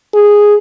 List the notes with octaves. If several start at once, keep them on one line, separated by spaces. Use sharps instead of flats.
G#4